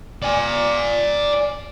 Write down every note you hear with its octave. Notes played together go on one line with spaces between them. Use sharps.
D5 G#5